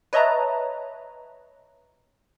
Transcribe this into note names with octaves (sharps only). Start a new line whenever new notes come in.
B4 C#5 D#5 E5 A5 A#5